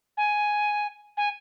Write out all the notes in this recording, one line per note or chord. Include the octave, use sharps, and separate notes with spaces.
G#5
G#5